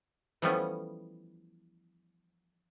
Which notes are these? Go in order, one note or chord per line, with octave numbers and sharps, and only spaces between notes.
E3 F3 G3 A3 B3 C#4